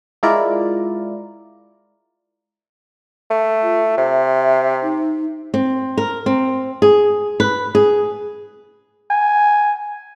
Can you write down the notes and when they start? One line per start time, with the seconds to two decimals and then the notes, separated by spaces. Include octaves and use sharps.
0.23 G#3 E4 F4 A#4 D5
3.30 A3
3.63 F4
3.97 C3 E5
4.82 D#4
5.54 C4
5.97 A#4
6.26 C4
6.82 G#4
7.40 B4
7.75 G#4
9.11 G#5